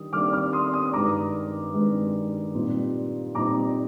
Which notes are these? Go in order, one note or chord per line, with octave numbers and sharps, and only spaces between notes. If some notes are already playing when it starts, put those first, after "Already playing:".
Already playing: D#3 G3 D4 D#6
D#3 G3 A#3 D4 D6 F6
D6 F6
C6 D#6
C6 D#6
G2 D#3 G#3 A#5 D6
G2 D#3 G#3
A#2 G3 C4 D#4
A#2 G3 C4 D#4 A#5 D6